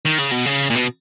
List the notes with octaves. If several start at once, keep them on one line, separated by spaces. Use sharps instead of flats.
D#3
C#3
B2
C#3
A#2
B2